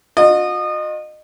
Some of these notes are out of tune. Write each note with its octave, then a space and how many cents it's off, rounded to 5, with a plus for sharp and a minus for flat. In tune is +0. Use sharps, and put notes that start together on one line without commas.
F4 +45 D#5 -25